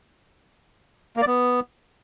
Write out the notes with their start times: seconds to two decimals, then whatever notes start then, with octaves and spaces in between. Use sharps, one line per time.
1.17 A#3
1.22 D5
1.27 B3